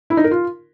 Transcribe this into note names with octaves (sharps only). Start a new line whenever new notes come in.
E4
D#4
A#4
F4